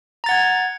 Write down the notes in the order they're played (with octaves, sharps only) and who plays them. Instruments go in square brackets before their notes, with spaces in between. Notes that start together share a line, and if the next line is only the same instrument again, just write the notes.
[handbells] A#5
A6
F#5
G#6